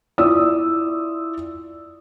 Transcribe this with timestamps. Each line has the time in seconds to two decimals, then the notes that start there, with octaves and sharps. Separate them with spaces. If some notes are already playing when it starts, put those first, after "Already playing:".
0.18 E4 F4 D5 D#6 E6